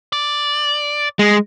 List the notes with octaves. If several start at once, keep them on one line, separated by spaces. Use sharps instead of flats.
D5
G#3